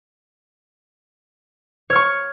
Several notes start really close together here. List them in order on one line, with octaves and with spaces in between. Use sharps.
C#5 F6 C#6